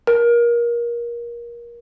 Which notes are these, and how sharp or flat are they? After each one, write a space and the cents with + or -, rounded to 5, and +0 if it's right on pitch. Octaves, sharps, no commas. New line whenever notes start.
A#4 +25